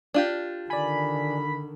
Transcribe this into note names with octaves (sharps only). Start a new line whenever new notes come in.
D4 F4 G4
D3 D#3 D5 G#5 B5